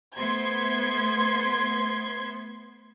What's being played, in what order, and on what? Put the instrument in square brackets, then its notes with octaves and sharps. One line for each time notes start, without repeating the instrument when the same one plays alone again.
[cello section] A3 B3 C5 [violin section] C6 G#6